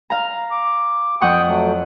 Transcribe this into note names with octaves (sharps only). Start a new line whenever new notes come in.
F5 A#5
D6
F2 F#5 G5 C#6 D#6
F#3 A3